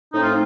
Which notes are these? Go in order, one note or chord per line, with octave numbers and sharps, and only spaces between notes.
A2 A3 C4 D#4
F4